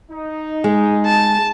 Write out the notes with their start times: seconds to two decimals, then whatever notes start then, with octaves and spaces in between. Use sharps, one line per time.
0.12 D#4
0.64 G#3
1.06 A5